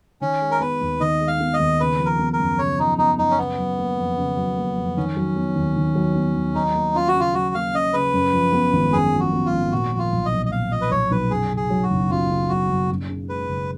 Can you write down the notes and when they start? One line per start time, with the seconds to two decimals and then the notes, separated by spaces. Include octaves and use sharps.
0.21 D#3 C#4
0.41 G#3
0.51 A#4
0.60 B3 B4
0.81 D#2
1.00 D#3 D#5
1.20 G#3
1.28 F5
1.41 B3
1.54 D#5
1.60 D#2
1.80 C#3 B4
1.99 F3
2.06 A#4
2.19 B3
2.33 A#4
2.39 F#2
2.58 C#3 C#5
2.79 F3 D#4
2.98 B3 D#4
3.18 F#2 D#4
3.30 C#4
3.38 C#3 B3
3.58 F#3
3.78 A#3
3.98 F2
4.18 C#3
4.37 F#3
4.57 A#3
4.77 F2
4.97 D#3 C#4
5.17 F#3
5.36 B3
5.56 D#2
5.76 D#3
5.95 F#3
6.15 B3
6.36 D#2
6.55 F#3 D#4
6.75 A#3
6.95 C#4 F4
7.08 F#4
7.15 C#3
7.20 F4
7.34 F#3 F#4
7.54 A#3 F5
7.74 C#4 D#5
7.93 C#3 B4
8.13 F#2
8.33 F3
8.53 B3
8.73 G#1
8.93 F#2 G#4
9.13 F3
9.20 F#4
9.32 B3
9.46 F4
9.52 G#1
9.72 A#2 F#4
9.92 F3
9.99 F4
10.12 B1
10.26 D#5
10.32 B1
10.46 D#5
10.51 A#2 F5
10.71 F3 D#5
10.81 B4
10.91 B1 C#5
11.11 B1 B4
11.31 F#2 G#4
11.50 C#3
11.57 G#4
11.70 F#3
11.83 F#4
11.90 F#1
12.10 F#2 F4
12.30 C#3
12.49 F#3 F#4
12.69 F#1
12.90 F#2
13.09 C#3
13.29 G#3 B4
13.49 F#1